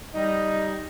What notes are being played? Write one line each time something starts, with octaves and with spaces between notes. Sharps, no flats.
G3 D#4